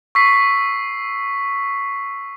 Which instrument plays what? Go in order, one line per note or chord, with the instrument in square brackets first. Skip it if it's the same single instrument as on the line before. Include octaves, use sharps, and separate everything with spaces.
[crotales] C#6 E6 B6 C7